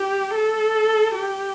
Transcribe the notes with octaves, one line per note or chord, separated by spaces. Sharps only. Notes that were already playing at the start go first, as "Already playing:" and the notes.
Already playing: G4
A4
G4